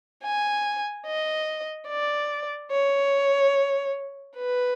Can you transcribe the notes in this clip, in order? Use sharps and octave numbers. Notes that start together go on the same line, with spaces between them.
G#5
D#5
D5
C#5
B4